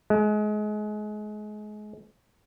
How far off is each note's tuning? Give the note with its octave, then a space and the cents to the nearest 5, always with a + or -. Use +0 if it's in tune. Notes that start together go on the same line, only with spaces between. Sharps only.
G#3 +30